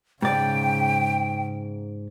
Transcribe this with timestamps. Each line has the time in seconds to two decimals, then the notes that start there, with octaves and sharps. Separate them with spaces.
0.22 G#2 C#3 D5 G5